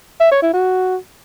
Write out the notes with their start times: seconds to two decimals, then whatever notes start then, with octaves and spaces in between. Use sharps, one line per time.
0.21 E5
0.32 C#5
0.43 E4
0.54 F#4